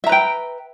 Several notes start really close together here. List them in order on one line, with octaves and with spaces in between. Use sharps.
E5 A#5 B4 G5